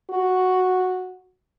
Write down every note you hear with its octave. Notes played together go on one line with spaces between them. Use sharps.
F#4